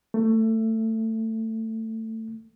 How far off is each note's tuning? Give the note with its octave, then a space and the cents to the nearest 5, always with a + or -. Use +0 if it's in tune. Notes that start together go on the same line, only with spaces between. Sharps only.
A3 +20